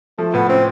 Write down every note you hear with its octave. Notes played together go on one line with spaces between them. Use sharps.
F3 A3
A2 B3
C4 C#4